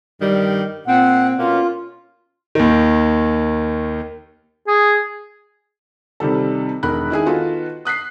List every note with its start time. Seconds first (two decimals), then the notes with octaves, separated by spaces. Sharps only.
0.21 G2 D#3 G3
0.88 A#2 C4 F#5
1.39 B2 A#3 C#4 F4
2.55 D#2 D#3
4.68 G#4
6.20 C3 D#3 G3 A4
6.83 E1 D#3 A#4 B5 F#6
7.10 D#3 E4 G#4 G#5
7.26 D#3 B3 F4 F#4 A4 B4
7.85 D#6 F#6 B6 C7